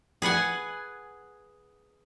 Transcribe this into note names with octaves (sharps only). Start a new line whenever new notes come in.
G#4 B4 F#5 G#5